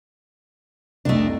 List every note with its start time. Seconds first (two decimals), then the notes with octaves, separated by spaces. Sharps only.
1.05 F1 C2 A3 D4 D#5